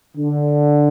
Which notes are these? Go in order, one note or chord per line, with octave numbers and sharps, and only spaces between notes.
D3